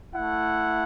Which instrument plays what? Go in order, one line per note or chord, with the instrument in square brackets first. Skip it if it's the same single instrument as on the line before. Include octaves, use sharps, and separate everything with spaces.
[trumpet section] A3 E4 F#5